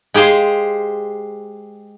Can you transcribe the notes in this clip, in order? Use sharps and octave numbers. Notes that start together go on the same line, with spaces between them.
G#3 G4 G#4 C5 F5